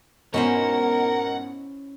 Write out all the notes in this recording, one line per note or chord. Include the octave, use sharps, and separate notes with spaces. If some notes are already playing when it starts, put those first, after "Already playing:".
G#2 B2 C#4 E4 A#4 C5 F#5